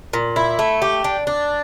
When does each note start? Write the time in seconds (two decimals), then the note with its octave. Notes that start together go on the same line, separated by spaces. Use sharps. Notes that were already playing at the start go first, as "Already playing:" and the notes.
0.13 A#2
0.36 E4
0.59 A3
0.82 G4
1.04 D4
1.27 D4